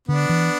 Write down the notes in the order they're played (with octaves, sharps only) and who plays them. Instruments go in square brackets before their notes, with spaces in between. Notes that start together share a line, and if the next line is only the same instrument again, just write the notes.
[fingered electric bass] D3 [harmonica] B3 D4
[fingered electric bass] E3